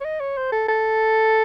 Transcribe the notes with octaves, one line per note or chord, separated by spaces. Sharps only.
C#5
D#5
C#5
C5
A4
A4